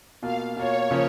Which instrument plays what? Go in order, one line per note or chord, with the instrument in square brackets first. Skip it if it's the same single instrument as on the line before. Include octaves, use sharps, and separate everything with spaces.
[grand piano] B2 A#3 F4 [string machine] F5
[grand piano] B2 A#3 F4 [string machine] C#5
[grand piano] C#3 F3 A#3